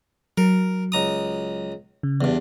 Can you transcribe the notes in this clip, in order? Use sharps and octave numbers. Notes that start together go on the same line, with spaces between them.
F#3 A#4
C#2 A#5 D#6
C#3
E2 G2